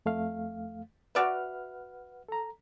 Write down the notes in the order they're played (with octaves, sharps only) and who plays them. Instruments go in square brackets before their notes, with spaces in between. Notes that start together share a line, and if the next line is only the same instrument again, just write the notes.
[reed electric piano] F2 A3 F5
[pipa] F#4 D5 E5 [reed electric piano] B4 F#5 F6
[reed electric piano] A4 A#5